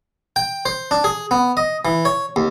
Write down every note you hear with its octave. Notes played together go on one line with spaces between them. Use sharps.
G5
C5
D4
G#4
B3
D#5
E3
C#5
D#2